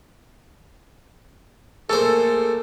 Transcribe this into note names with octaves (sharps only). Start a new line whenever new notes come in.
A3 A#3 G#4 A4 C5